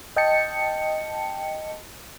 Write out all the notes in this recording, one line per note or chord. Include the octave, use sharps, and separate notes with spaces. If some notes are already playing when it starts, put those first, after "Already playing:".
D#5 G5 A5 C#7